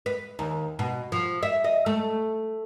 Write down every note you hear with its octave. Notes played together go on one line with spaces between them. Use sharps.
B4
D#2
B2
F3
E5
D#5
A3